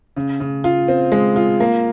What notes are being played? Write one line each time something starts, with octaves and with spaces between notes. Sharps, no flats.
C#3
C#3
F4
C4
G#3
F4
A#3